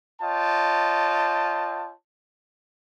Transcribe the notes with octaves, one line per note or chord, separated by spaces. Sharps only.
F4 C#5 D#5 G5 A5